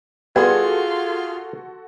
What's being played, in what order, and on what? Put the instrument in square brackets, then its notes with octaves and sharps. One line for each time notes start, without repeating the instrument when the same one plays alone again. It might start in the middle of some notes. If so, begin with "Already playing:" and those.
[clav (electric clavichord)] G3 B3 [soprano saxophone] F4 [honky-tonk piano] F#4 A4 C6 [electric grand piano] G#4 G#6